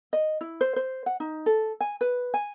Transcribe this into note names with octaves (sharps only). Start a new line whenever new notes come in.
D#5
E4
C5
C5
F#5
D#4
A4
G#5
B4
G#5